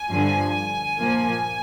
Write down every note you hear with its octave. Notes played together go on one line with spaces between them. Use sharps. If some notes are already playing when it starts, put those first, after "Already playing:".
Already playing: G#5
G2 D3 F3
A#2 F3 A#3